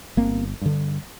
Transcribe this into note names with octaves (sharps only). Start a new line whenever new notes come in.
G1 A#3 C4
G2 D3